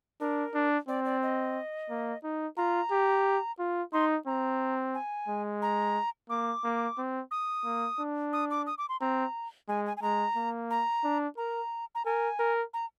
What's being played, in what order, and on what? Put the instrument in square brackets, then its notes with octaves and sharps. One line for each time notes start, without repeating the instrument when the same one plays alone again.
[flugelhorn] D4 [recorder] A#4
[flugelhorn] D4
[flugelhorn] C4 [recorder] D5
[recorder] D5
D#5
[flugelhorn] A#3
D#4
[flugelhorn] F4 [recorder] A#5
[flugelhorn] G4
F4
[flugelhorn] D#4 [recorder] C6
[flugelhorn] C4 [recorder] A#5
[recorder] G#5
[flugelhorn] G#3
[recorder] A#5
[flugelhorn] A#3 [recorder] D6
[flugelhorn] A#3
C4
[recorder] D#6
[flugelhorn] A#3
D4
[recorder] D#6
D6
D#6
D6
C6
[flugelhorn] C4 [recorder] A#5
[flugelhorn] G#3 [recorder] G#5
[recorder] G#5
G#5
[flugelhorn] G#3 [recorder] A#5
[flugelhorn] A#3
[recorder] A#5
[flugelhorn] D4
[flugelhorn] A#4 [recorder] A#5
[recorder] A#5
[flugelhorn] A#4 [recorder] G#5
[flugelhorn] A#4
[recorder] A#5